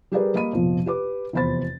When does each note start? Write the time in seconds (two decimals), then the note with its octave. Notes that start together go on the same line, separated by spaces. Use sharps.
0.12 G3 G4 G#4 A#4 B4 D5
0.34 G3 A#3 D#5 B5 D#7
0.53 F1 A#1 B2 F3
0.86 G4 B4 D6
1.33 F1 E2 C5 B5 A6